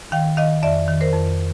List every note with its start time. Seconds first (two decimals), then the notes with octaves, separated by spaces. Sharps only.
0.12 D#3 F5 G5
0.37 D#3 D#5 F5
0.62 F2 D5 E5
0.88 D#3
1.01 A#4 C5
1.13 F2